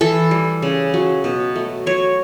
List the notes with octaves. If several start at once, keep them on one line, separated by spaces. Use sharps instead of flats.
E3 A4
G3
C#3
F#3
B2
A3
F#3 C#5